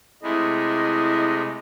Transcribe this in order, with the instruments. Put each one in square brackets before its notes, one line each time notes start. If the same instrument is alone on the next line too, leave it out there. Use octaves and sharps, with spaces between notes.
[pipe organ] C3 G#3 A3 [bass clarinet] E4 [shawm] D#5